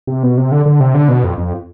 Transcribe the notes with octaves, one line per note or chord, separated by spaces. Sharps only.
C3
B2
C3
D3
D3
C3
D3
B2
F2
F2